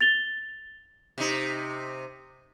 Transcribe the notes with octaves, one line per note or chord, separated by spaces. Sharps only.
A6 F7 G7
C3 D#4